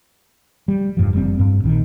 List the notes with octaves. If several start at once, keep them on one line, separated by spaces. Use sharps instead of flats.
G3
F1 G2 F3
F#1 G3 C4
G2 C4
A#1 D#3